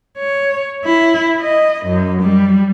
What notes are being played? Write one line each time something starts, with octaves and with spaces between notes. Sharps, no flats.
C#5
E4
D#5
F#2
G3